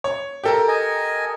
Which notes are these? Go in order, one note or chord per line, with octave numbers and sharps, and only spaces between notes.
C#5
G4 A4 A#4
D#5 G#5